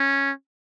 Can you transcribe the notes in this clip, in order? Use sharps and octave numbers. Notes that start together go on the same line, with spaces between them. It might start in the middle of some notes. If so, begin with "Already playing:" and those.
Already playing: C#4